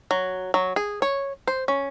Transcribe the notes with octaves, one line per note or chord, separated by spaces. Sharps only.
F#3
F#3
G#4
C#5
C5
C#4